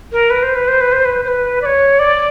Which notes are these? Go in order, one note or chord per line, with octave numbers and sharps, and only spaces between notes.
A#4
B4
C5
B4
C5
B4
C5
B4
C5
B4
D5
C#5
D5